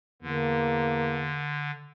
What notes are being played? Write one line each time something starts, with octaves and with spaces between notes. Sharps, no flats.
E2 D3 A#3